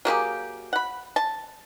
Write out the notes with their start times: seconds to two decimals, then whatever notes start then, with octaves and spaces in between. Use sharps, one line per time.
0.05 F#3 A#3 G4 G#4
0.73 F#5 B5
1.16 A5